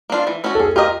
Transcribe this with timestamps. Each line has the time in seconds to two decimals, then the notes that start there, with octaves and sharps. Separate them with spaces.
0.10 A#3 D4 F4
0.27 E3
0.44 A3 C#4 F#4
0.55 A4
0.59 C#4 G#4
0.76 F4 G4 A#4 D#5